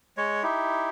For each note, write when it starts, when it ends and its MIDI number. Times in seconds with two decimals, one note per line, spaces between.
0.17 0.43 56
0.17 0.43 73
0.43 0.90 63
0.43 0.90 64
0.43 0.90 67